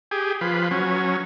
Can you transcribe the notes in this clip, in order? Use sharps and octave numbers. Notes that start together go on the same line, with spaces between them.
G4 G#4
F3 B4
F#3 C#4